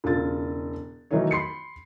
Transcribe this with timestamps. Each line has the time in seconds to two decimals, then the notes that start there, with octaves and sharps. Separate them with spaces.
0.04 E1 C#3 F4 A4 A6
1.11 D#3 E3 F#3 A3 D#4 C#5
1.31 B5 C6 C7 C#7